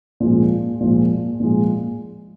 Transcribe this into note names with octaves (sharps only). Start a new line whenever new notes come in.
A#2 F3 G#3
A#2 F3 G#3
A#2 F3 G#3